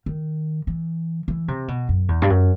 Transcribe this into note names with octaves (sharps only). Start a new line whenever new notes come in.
D#3
E3
E3
C3
B2
F#2
E2
G2
F#2